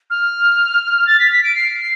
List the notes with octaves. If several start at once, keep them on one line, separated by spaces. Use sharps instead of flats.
F6
A6
B6
B6
D7
C7
C7